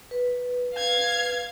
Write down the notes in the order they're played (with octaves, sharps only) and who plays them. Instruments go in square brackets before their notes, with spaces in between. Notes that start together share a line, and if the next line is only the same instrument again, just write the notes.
[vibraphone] B4
[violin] F5 G#6